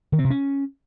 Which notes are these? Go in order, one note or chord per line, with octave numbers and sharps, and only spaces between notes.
D#3
C4
C3
C#4